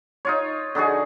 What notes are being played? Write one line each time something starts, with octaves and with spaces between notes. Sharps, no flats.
D#4 F4 C#5
D3 D#4 F#4 G#4